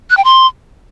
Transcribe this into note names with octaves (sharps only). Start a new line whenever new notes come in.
F#6
G5
C6